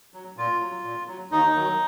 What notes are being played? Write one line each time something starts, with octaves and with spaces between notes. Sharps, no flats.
F#3
A#2 F4
F#3
A#2
F#3
D#2 D#4
D#3 F#3